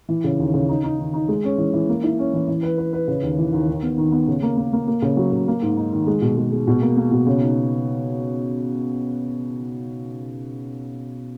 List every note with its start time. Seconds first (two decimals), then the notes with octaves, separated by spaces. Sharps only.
0.09 E3
0.24 C#3
0.39 D#2
0.54 C#3
0.69 D#4
0.84 D#4
0.99 D#3
1.14 D#4
1.28 G#3
1.44 C#4
1.58 E3
1.73 E3
1.89 A#3
2.04 E4
2.19 C#4
2.34 E3
2.48 E3
2.63 B4
2.78 B4
2.93 B4
3.08 C#3
3.23 D#2
3.38 E3
3.53 D#2
3.68 D#3
3.82 B3
3.98 D#3
4.12 B3
4.28 C#3
4.43 A#3
4.57 A#3
4.73 A#3
4.87 A#3
5.02 C#3
5.17 F#3
5.33 C#3
5.48 A#3
5.62 G#2
5.77 D#4
5.92 D#3
6.07 G#3
6.22 B2
6.37 G#3
6.52 G#3
6.67 B2
6.81 A#3
6.97 A#3
7.11 B2
7.27 C#3
7.41 D#4